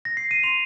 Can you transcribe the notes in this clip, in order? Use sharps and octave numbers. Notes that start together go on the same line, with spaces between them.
A#6
C7
D#7
C6 F7